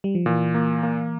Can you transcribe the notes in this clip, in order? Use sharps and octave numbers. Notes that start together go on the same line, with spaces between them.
G3
F3
A#2 E3
A#3
A#3